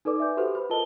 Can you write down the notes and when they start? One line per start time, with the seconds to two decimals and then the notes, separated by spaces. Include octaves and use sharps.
0.05 D#4 A4 B4 D5 D6
0.20 E5 G#5 G6
0.37 F#4 G4 A4 B4 C5 F#5
0.55 C5 B5
0.70 F4 A4 A#4 D#5 A5 G7